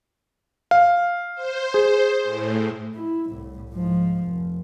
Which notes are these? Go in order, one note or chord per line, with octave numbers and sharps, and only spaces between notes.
F5
C5
G#4
A2
E4
C2 A2
G#2 F3
F1